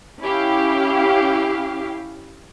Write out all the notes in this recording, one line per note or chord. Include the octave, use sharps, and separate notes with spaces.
C#4 E4 G4 F5